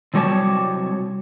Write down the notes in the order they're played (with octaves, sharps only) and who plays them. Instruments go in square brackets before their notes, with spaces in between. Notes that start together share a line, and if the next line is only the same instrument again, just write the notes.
[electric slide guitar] C3 F#3 G3 A#4 C#5 A5